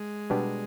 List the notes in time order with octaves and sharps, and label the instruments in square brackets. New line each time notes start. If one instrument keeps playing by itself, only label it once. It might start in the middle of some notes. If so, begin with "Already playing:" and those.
Already playing: [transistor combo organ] G#3
[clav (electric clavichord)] B2 G3 B3 D4 G4